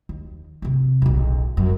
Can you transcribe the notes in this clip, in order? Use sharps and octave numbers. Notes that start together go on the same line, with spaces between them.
D#2
C3 C4
D1 B1
G1 F#2